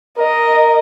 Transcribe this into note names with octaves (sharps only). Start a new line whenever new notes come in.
A#4 D#5